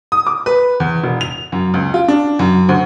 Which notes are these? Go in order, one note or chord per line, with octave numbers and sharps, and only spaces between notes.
D#6
D6
B4
E2
E1
F7
F#2
C#2
F4
D4
F#2
D2